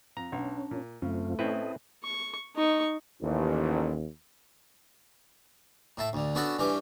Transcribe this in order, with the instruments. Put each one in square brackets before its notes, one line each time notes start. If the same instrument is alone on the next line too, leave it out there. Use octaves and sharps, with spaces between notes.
[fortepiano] F2 [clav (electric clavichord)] A#5
[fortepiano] B1 [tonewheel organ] C#4 [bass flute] D4
[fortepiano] A#2
[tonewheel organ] F#2 C4 F4 [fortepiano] C#3 [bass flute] A3
[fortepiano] A2 C#4 [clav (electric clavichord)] C4 E4 B4 [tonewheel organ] A4 D#5
[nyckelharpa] C#6
D#4 C#6
[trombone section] A1 [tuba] D#2
[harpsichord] A2 E4 A5
D2 D3
B3 C#4 D4 F#4 A4 F#5
G2 E3 C#4 G4 D6